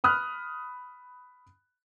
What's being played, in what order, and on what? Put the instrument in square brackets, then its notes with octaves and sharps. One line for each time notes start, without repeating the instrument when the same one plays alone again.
[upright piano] B5 D#6 F6 F#6